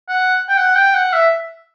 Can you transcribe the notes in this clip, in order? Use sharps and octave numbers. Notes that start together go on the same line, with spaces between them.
F#5
G5
F#5
G5
F#5
E5